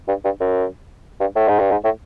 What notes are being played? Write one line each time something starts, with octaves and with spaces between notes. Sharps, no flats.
G2
G2
F#2
G2
A2
G#2
G2
G#2
A2